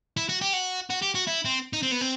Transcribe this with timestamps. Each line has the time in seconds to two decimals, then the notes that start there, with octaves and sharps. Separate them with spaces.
0.17 E4
0.29 F#4
0.41 G4
0.53 F#4
0.90 F#4
1.02 G4
1.15 F#4
1.27 E4
1.45 C4
1.73 D#4
1.83 C4
1.92 B3
2.01 C4